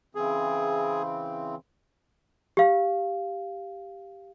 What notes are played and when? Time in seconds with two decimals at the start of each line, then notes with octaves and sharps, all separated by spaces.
0.15 C#3 E3 C4 G#4
2.57 G4 F5